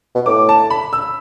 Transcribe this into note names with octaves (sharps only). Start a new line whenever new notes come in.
B2
A2 D6
A5
B5
E6